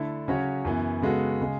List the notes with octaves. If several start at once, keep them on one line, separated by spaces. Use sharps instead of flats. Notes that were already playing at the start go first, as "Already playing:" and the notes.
Already playing: D3 A3 E4 A4
C#3 F#3 C#4 F#4 C#5
F#2 E3 B3
C#3 G#3 B3 F#4 A4
C#3 G#3